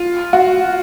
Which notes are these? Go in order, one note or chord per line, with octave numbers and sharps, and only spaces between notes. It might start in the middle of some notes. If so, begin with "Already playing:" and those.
Already playing: F4
F#4